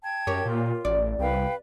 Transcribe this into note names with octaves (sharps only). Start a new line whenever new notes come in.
G5 A5 G#6
F#2 G4 A#4 C#5
A#2 F4
A1 D5
C2 B4 F5 G5